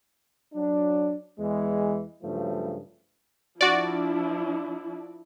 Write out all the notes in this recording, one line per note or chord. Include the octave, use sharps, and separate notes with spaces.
F#3 D4
E2 E3 G#3
G2 C#3 F3 F#3 A3
F3 D4 E4 F#4 D5